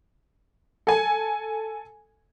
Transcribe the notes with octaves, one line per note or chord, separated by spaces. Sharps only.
A4 G#5